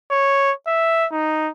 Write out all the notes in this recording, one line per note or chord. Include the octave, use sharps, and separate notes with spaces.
C#5
E5
D#4